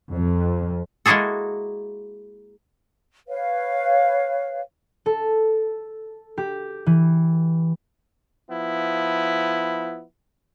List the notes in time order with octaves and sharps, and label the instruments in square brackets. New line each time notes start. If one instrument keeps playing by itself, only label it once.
[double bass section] F2
[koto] G#3 A#3 E4 F#4 G#4 A4
[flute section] B4 C#5 F5
[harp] A4
G4
E3
[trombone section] F3 B3 E4